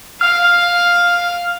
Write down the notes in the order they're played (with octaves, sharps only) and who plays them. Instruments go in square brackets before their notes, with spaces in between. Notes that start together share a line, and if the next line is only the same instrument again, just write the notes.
[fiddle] F5 [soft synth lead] F6